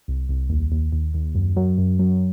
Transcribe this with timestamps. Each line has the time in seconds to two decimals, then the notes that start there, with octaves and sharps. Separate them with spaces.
0.08 C2
0.29 C2
0.50 D#2
0.72 D#2
0.92 D#2
1.14 D#2
1.35 F#2
1.56 F#3
1.78 F#2
1.99 F#3